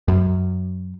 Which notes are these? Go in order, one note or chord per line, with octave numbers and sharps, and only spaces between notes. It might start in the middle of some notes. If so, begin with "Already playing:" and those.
F#2